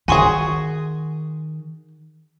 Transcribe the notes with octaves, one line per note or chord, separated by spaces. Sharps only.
D#3 F#4 G#4 G#5 C6 C#6